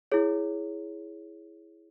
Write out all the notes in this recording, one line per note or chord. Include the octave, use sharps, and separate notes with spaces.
E4 G#4 C#5